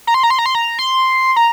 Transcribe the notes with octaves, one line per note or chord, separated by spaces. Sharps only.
A#5
C6
A#5
C6
A#5
C6
A#5
C6
A#5